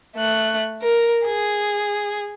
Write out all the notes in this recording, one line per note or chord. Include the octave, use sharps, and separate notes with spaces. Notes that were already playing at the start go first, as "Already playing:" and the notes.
A3 F#6
A#4
G#4